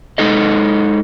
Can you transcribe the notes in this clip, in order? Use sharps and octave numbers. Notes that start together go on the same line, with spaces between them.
G#3 D#4 A4 D#5